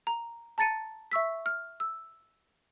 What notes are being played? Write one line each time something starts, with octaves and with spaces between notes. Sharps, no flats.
A#5
A5 A#5 A6 C#7 D#7
E5 C#6 E6 B6
F6
E6